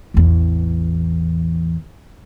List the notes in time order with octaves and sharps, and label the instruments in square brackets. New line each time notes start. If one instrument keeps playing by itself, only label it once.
[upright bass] A1 E2